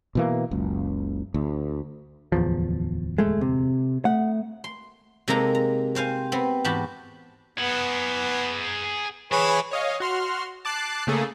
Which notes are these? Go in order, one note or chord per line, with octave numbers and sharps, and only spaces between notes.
B2 E3 A#3
F#1 C#2
D2
D1 E2 F3
G#3 A3
C3
A3 F#5
C6
C3 G#3 A#3 D#4 A4 A#5
A#5
C4 C5 F5 G#5
B3 C4
E2 G#2 F#4 G4 A5 B5
B3 G#4 F#5
E3 G#4 B4 C#5
C#5 D#5 F5
F#4 C6 F6
A5 D6 F#6 C7
C#3 A3 A#3 G#4 A4